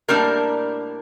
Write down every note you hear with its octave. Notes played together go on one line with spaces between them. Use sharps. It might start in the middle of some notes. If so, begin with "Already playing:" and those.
A2 G3 A#3 D4 A#4